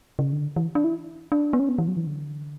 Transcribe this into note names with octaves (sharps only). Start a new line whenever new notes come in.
C#3
D3
E3
D4
E4
D4
B3
C#4
B3
E3
F#3
E3
D3